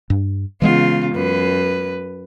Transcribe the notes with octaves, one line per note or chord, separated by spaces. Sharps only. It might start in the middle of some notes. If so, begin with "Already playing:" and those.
G2
C#3 E3 G#3 B3 F4
F#2 B4